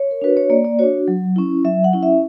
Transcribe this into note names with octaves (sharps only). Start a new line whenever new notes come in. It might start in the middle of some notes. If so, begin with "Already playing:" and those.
Already playing: C#5
A#4
D4 F#4 B4
C#5
A#3 D5
D5
D4 F#4 C#5
F#3
C#4 E4
F#3 E5
F#5
C#4 E4
E5